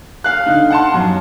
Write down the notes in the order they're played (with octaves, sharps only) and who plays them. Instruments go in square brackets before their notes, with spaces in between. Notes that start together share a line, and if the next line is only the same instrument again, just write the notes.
[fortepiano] F5 F#6
[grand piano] D3 D#4
F#5 A5 C6
F#2